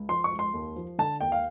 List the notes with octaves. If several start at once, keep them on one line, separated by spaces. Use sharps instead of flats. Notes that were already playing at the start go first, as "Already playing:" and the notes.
Already playing: C#2
F3 C6
C#6
C#2
C6
D#2
F3
D3 A5
D#2 G5
F5